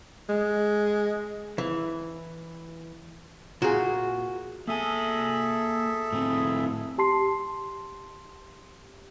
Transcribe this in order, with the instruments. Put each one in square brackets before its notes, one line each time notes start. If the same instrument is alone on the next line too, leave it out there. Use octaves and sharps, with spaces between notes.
[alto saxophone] G#3
[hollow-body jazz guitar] E3
[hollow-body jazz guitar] A#2 G#4 [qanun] F#4
[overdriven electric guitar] A#3 G#5 [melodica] G#4 A4 E5
[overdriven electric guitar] A2 C4
[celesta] G4 A5 C6 C7